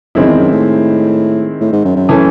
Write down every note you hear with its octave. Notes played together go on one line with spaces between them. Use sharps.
F#2 D#3 G#3 C4 E4
E2
F#2
A2
A2
G#2
F#2
F#2
E3 A3 C#4